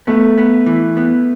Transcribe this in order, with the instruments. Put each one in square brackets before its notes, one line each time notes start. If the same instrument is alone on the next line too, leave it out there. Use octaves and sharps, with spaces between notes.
[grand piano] A3 [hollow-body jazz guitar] B3
[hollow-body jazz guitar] B3
E3
B3